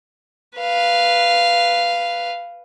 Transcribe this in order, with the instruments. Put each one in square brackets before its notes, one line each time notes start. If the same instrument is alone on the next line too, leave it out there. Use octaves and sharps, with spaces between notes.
[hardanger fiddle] B4 F5